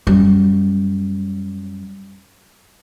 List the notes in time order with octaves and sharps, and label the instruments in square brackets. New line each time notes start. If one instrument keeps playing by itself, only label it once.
[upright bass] F#2 G3